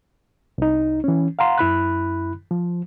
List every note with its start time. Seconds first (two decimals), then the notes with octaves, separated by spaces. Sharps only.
0.58 C2 D#4
1.04 E3 C#4
1.39 F5 F#5 A#5 C6
1.58 F#2 E4 B5 F#6
2.51 F3